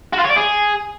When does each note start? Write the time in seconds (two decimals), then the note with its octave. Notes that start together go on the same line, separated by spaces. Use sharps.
0.13 F#4
0.19 F4
0.25 C#5
0.31 D5
0.36 G#4